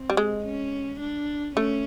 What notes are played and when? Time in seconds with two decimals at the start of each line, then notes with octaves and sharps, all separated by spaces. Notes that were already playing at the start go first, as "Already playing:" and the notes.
Already playing: C4
0.10 G3
0.17 G#3
0.45 C#4
1.00 D4
1.56 A3 C#4